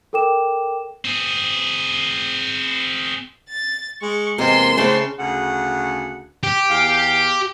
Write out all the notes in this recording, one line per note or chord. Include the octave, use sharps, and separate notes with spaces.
A4 A#4 G5 D6 E7
C4 G#4
A6
G#3 C#6
E2 C3 G#3 A#3 C6 E6
C#3 A3 C4 D4
D2 C#3 F#5
G4
E2 F5